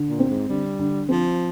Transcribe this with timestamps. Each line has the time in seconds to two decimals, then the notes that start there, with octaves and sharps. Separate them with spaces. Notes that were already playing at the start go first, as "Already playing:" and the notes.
Already playing: D3
0.09 A#2
0.19 C4
0.29 G#2
0.49 D3 G3
0.79 D3
1.09 F3 C4